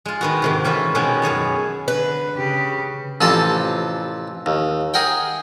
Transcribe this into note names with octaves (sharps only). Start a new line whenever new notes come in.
G#3 F4
D#3 B3 F#4
G#2 C3 D#3
E3 A#3 C#4 F4 B4 E5
B2 D#3 G#3 B3 C#4
F#2 G#4 C#5 A5
D3 B4
C#3 G4
A1 C3 E3 F3 A4 A5
D#2
G#4 A#4 F#5 G5